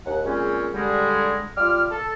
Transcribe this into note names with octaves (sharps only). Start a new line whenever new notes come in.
D#2 F#5
A#2 C#3 G#3 C4 C#4
D3 G3 G#3
G3 F4 D6 F6
A4